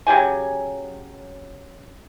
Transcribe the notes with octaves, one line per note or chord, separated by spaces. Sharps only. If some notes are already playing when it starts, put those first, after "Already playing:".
C#3 F#3 G4 G#5